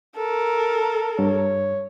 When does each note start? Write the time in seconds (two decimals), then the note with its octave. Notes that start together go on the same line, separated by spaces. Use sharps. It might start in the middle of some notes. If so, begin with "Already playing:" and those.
0.16 A4 A#4
1.19 G2 C#5